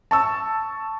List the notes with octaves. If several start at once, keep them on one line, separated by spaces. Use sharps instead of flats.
A5 C#6 E6